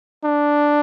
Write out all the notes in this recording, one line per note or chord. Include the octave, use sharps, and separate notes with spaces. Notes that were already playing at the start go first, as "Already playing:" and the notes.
D4